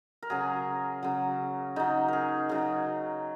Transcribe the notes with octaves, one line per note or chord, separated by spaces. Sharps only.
A#4
C#3 F#3 G#4
C#3 F#3
C#3 F#3 D#4
G#4 A#4
C#3 F#3